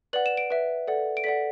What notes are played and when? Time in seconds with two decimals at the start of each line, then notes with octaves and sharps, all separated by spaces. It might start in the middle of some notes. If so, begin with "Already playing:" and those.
0.13 B4 D5 F#5 F#7
0.26 E7
0.37 D7
0.50 B4 E5
0.88 A4 D5 F#5
1.17 D7
1.24 A4 D5 F#5 B6